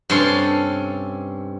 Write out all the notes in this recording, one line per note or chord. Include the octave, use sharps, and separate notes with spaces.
G2 C3 C#4 A4 C6